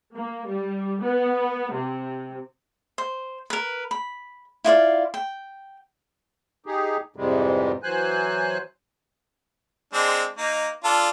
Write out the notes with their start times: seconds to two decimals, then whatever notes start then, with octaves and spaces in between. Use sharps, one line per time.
0.16 A#3
0.48 G3
1.03 B3
1.74 C3
2.98 C5
3.50 A#4 B4
3.91 B5
4.64 E4 F4 D5 F5
5.14 G5
6.66 D#4 G4 G#4
7.16 F2 G#2 C3 E3 G3 G#3
7.83 E3 F#3 C5 G#5 F#6
9.93 G#3 C4 D4
10.37 A#3 D#4
10.84 D4 F4 A4